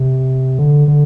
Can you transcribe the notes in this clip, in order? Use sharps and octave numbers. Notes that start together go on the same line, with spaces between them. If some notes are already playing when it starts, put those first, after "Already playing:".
Already playing: C3
D3
D3